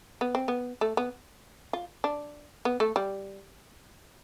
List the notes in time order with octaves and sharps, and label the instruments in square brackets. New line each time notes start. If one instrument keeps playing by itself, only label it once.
[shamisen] B3
C4
B3
A3
B3
F4
D4
B3
A3
G3